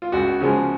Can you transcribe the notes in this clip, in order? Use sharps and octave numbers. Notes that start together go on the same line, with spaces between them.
F4
C#2 F#4
C#3 F3 G#3